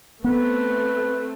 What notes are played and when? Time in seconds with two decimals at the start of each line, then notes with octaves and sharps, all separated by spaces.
0.24 A3 B3 C4 B4